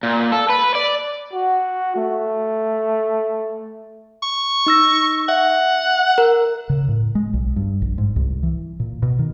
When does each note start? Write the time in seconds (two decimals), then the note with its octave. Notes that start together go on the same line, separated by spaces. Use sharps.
0.03 A#2
0.32 A4
0.49 B4
0.75 D5
1.33 F#4
1.96 A3
4.23 C#6
4.67 D#4 E6 A#6
5.29 E5 F#5
6.18 A#4
6.70 C#3
6.88 A2
7.15 G#3
7.34 B1
7.56 G2
7.82 A#1
7.98 G#2
8.16 C2
8.43 E3
8.80 A#2
9.03 B2
9.19 D#3